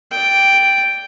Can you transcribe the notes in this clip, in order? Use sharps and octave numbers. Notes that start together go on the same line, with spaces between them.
D5 G5